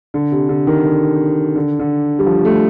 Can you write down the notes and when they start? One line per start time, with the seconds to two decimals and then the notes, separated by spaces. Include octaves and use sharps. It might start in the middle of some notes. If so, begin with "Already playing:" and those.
0.14 D3
0.32 C3
0.49 D3
0.67 D#3
0.85 D3
1.56 D3
1.79 D3
2.19 G3
2.26 F3
2.45 A3